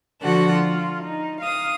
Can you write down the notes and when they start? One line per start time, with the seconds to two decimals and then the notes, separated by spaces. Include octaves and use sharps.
0.21 D3 F3 F#4 A4 F#5
0.54 F4
1.04 D#4
1.42 F5 D#6